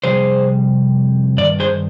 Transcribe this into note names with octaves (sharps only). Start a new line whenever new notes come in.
F2 C3 G3 G#4 C5
G2 D#3 D5
G#4 C5